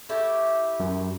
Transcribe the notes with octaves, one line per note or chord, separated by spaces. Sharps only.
A3 E4 G4
F#2